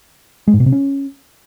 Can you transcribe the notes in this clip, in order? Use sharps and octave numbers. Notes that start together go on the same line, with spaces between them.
G#3
G#2
B2
C3
C#4